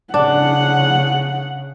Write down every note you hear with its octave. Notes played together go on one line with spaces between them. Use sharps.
C#3 D4 F#5